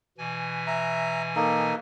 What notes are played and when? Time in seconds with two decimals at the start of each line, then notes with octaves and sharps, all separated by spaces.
0.18 B2 E3 G#5
0.67 E5 A#5
1.36 A#3 D#4 A4